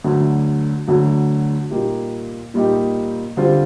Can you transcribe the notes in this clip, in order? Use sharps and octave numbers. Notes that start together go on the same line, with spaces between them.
D2 D3 F#3
D2 D3 F#3
A#2 G3 A#3 D#4 G4
A#2 G3 A#3 D#4 G4
D3 G3 C4 F4